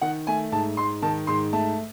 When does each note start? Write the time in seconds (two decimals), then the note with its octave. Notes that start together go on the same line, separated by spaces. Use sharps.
0.01 D#3 F#5
0.27 A3 G#5
0.52 G#2 A5
0.77 G#2 C6
1.02 D#3 A5
1.27 G#2 C6
1.53 A3 A5